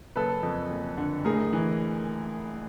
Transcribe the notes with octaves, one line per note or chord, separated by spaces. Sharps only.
F#1 A4 B4
F2
F#1
D3
A2 G#4 A#4
E3